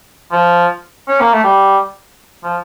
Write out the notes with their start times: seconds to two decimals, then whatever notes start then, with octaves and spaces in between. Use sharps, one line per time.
0.32 F3
1.08 C#4
1.20 A#3
1.33 A3
1.44 G3
2.44 F3